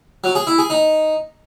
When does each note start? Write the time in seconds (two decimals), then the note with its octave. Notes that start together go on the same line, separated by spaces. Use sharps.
0.24 F#3
0.35 G#4
0.47 E4
0.58 G#4
0.70 D#4